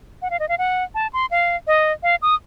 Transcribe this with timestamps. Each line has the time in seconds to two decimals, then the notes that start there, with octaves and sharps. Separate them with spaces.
0.22 F#5
0.31 F5
0.40 D#5
0.49 F5
0.58 F#5
0.95 A5
1.13 C6
1.31 F5
1.67 D#5
2.03 F5
2.22 D#6